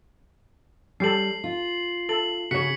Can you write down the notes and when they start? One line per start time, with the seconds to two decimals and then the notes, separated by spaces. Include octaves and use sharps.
1.00 G3 C#4 G4 A4 C7 F#7
1.44 F4
2.09 A4 F#7
2.51 C#3 F#4 G#4 C#5 B6 C#7